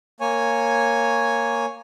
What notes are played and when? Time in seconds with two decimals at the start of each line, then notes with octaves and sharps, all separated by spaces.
0.20 A#3 C#5 G#5